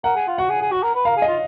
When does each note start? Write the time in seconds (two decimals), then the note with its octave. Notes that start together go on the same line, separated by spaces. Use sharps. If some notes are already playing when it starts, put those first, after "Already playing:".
0.04 A#4 F#5
0.16 G#4
0.27 F4
0.38 F#4 F#5
0.50 G#4
0.61 G#4
0.71 F#4
0.83 A#4
0.95 B4
1.05 A#4 F5
1.17 G#4
1.22 D#5
1.28 F4